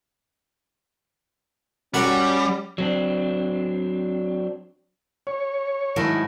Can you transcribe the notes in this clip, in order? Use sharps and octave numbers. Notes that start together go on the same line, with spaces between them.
G3 C#4 F#4 A#4 F#5
F#3 C4 D4
C#5
G#2 D#3 F#3 A3 E4 A#4